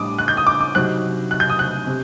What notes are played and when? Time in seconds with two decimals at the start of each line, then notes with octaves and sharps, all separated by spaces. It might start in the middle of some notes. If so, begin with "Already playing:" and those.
Already playing: A2 G3 D4 D6 D#6
0.18 F#6
0.28 G6
0.37 D#6
0.47 D6
0.61 D6
0.74 C3 F#3 C4 D#4 F#6
1.31 F#6
1.40 G6
1.50 D#6
1.59 F#6
1.87 C3